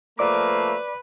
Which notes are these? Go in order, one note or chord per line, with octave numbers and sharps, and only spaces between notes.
F3 A3 A#3 B4 D5 D6